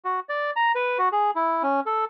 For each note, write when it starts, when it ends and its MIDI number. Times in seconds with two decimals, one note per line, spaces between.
0.05 0.20 66
0.29 0.51 74
0.56 0.72 82
0.75 0.98 71
0.98 1.09 66
1.12 1.31 68
1.36 1.63 64
1.63 1.80 61
1.86 2.05 69